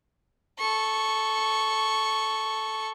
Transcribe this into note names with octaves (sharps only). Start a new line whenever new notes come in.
A4 C#6